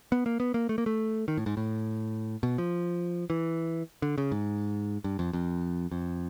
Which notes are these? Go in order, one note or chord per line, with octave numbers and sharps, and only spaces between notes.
B3
A#3
B3
A#3
A3
A#3
A3
D#3
A2
G#2
A2
B2
F3
E3
D3
C#3
G#2
G2
F2
F2
F2